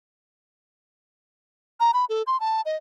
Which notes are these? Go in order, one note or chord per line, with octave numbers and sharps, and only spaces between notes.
A#5
B5
A4
C6
A5
D#5